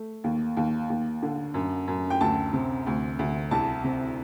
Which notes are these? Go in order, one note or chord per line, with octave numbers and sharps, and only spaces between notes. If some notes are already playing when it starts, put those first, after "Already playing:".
Already playing: A3
D#2
D#2
D#2
D3
F#2
F#2
G5
D2 A5
C3
D2
D2
C2 A5
C3